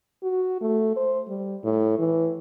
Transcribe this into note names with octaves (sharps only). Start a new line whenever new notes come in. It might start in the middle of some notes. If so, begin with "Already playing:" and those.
F#4
A3
C5
G3
A2
E3